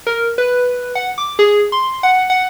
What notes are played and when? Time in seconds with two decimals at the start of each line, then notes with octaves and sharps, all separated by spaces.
0.07 A#4
0.38 B4
0.95 F#5
1.18 D6
1.39 G#4
1.72 C6
2.03 F#5
2.30 F#5